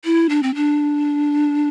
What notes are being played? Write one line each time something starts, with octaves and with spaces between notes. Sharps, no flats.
E4
D4
C4
D4